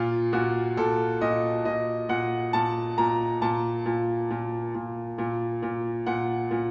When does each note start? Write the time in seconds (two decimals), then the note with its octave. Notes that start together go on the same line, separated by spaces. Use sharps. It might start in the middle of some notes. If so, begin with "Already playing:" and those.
Already playing: A#2 F4
0.33 A#2 F#4
0.77 A#2 A4
1.21 A#2 D#5
1.65 A#2 D#5
2.09 A#2 F#5
2.53 A#2 A5
2.98 A#2 A#5
3.42 A#2 A5
3.86 A#2
4.30 A#2
4.75 A#2
5.18 A#2
5.62 A#2
6.06 A#2 F#5
6.51 A#2